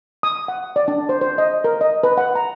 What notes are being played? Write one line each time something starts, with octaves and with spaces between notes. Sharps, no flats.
D#6
F#5
D5
D4
C5
C5
D#5
A#4
D#5
B4
F#5
A#5